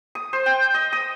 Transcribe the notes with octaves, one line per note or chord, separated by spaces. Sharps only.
D#6
C5
G5
D#5
D#6